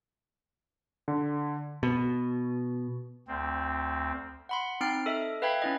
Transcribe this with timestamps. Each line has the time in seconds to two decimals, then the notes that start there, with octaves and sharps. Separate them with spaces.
1.08 D3
1.83 B2
3.28 D2 C4
4.49 F#5 B5 C6
4.81 C4 D#4 F6 C7 D7
5.06 A4 D#5 E5
5.42 B4 E5 F5 G5 B5 G#6
5.62 C#4 E4 D#5